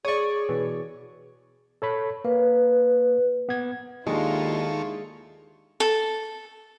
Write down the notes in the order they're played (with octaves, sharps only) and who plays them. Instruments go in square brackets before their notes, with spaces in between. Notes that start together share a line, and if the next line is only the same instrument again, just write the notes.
[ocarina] G#4 [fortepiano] C#5 D5 [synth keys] C#6 D#6
[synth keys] B2 E3
[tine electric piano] A4 C#5 B5
[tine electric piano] A#3 [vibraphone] B4
[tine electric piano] B3 G#6
[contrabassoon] D#2 [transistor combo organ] D#3 A4 C#6 [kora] G#3 D4 [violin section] E4 F4
[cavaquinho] A4